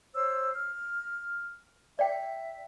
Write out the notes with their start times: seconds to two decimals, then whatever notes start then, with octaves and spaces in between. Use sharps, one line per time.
0.14 C5 C#5 E6
0.55 F6
1.99 D5 E5 G5